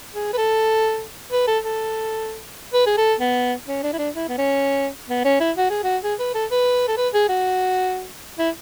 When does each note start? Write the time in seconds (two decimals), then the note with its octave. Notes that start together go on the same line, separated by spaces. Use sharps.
0.14 G#4
0.33 B4
0.38 A4
1.32 B4
1.48 A4
1.64 A4
2.73 B4
2.86 G#4
2.97 A4
3.20 B3
3.68 C#4
3.83 D4
3.93 E4
3.98 D4
4.15 E4
4.28 B3
4.38 C#4
5.09 B3
5.25 C#4
5.40 E4
5.56 F#4
5.70 G#4
5.83 F#4
6.03 G#4
6.19 B4
6.34 A4
6.51 B4
6.88 A4
6.97 B4
7.13 G#4
7.29 F#4
8.39 E4